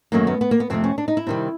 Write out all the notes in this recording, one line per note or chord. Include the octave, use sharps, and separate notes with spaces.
F#2 D#3 F#3 A3 A#3
B3
B3
A#3
B3
F2 C3 F3 A3 C4
C#4
D4
D#4
E4
C3 D#3 G3